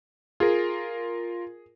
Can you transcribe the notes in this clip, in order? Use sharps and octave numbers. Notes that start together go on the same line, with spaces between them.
F4 G#4 A#4